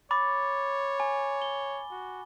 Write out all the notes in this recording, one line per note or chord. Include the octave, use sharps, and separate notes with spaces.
C#5 B5 D6 A6
G#5
G7
F#4